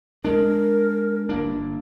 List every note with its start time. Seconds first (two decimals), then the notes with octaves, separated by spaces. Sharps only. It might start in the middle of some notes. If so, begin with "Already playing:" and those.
0.25 G#3 D4 A#4
1.29 G1 A#3 D4